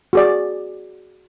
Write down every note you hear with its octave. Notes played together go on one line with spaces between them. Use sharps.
F#4 G#4 D5